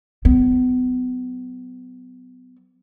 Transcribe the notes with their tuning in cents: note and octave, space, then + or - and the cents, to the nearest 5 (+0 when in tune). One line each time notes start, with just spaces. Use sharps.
F#3 +10 B3 +35